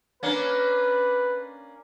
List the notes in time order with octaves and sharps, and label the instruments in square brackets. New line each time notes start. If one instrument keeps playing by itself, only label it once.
[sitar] A#3 C#4 D4 [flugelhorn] B4